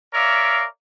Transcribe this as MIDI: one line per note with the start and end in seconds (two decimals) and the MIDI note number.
0.14 0.66 70
0.14 0.66 73
0.14 0.66 74
0.14 0.66 76
0.14 0.66 77